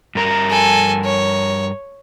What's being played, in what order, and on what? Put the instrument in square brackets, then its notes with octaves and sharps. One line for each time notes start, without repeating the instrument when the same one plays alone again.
[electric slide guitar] G2 A#4 A#5
[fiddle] A4 G#5
C#5